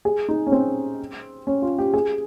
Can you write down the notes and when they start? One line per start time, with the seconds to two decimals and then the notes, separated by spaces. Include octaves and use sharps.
0.05 G#4
0.29 D#4
0.47 C#4
0.52 C4
1.47 C#4
1.62 F4
1.79 G4
1.94 G#4